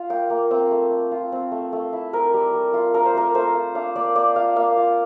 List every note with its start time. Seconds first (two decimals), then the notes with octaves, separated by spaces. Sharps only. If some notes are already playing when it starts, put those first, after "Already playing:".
Already playing: F4 F5
0.10 A#3 G5
0.30 A#3
0.50 C4 G5
0.71 A3
0.91 A3
1.12 F4
1.32 C4
1.52 A3
1.73 A3
1.93 E4
2.13 C4 A#4
2.34 G3
2.54 G3
2.74 F4
2.94 D4 A#4
3.05 C5
3.14 A3 A#4
3.35 A3 C5
3.55 F4
3.75 D4 F5
3.96 A#3 D5
4.15 A#3 D5
4.36 F4 F5
4.56 A#3 F5
4.77 F4